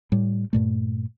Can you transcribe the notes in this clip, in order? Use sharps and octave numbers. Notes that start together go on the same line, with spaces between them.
A2 G3
G2 A#2 A3